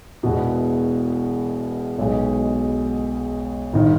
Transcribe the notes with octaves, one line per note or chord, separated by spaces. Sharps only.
E1 E2 B2
B1 B2 G#3
G1 D#3